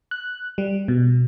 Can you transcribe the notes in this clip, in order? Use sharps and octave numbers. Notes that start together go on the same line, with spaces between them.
F#6
G3
B2